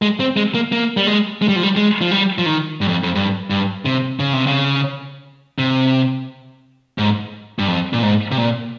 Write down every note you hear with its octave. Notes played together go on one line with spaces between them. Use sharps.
G#3
C4
G#3
A#3
A#3
G3
G#3
G#3
G3
F3
G3
G#3
F3
G3
F3
D#3
G2
F2
F2
G2
G2
C3
C#3
C3
C#3
C3
G#2
G2
F2
A#2
G#2
C3
A#2